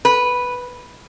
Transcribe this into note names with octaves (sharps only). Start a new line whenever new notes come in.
B4